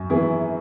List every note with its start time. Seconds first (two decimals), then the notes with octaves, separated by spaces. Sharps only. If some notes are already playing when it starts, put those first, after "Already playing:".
Already playing: F#2
0.10 E3 B3 E4 G#4